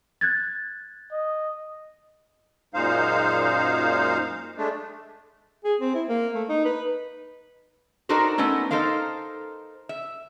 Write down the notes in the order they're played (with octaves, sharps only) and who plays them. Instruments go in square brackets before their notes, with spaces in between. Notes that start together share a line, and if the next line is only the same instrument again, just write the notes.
[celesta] F#6 G#6 A6
[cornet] D#5
[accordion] F#2 A#2 G#3 D#4 C5 F5
G#3 A3 D4
[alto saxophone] G#4
C4
E4
A#3
A3
D#4
B4
[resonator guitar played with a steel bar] D4 D#4 F#4 A4 A#4 C5
A3 B3 C#4 D#4
D#4 A4 A#4 C5 F5
E5